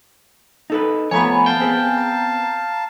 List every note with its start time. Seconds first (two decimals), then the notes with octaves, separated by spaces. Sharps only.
0.70 D#4 A4 B4
1.11 F2 A3 B3 C#5 G#5 A#5 B5
1.46 F5 G5 A5
1.60 B3 C4 G#4 G#5
1.97 A#5